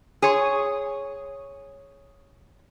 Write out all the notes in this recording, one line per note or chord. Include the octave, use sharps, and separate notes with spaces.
G#4 C#5